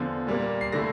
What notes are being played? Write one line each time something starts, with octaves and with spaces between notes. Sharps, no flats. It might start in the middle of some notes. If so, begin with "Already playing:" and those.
Already playing: E2 D3 F3
A#2 G3 A#3
C7
D3 A3 E4 A#6